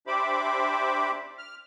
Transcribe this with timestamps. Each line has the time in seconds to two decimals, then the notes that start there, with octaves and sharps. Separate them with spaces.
0.07 D4 G4 C5 E5 B5 D6
1.38 F6